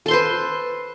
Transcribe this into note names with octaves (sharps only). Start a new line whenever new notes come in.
A4 B4 C5 C6